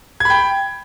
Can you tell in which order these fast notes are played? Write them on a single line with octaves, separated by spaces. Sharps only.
G#6 B5 G5